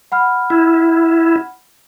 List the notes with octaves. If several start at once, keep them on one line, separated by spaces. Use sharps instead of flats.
F#5 B5 F6
E4